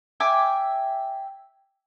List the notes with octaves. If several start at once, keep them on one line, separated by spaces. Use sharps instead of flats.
E5 G5 G#5 D6